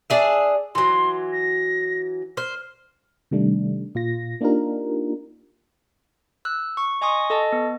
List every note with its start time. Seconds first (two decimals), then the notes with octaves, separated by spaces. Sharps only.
0.10 D4 G#4 E5
0.75 E3 F#3 C6
1.32 A#6
2.37 C5 F6
3.31 C3 D#3 G3 A3 D4
3.95 A#2 F4 A#6
4.41 A#3 D4 D#4 F4 G4 A#4
6.45 E6 F#6
6.77 C#6
7.01 D#5 G#5 C6 C#6 D#6
7.30 A4 D#5 A5
7.52 B3